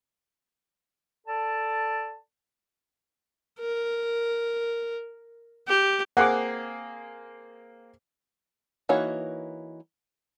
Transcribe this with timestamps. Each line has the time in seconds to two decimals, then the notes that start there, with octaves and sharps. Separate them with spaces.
1.27 A4 D5 A5
3.60 A#4
5.67 G4
6.17 A#3 C4 G#4 F#5 D6
8.89 E3 A#3 D#4 F#4 C#5